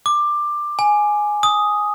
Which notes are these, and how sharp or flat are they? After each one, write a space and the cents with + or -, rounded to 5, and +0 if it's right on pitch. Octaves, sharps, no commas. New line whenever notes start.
D6 +15
G#5 +5
D#6 +5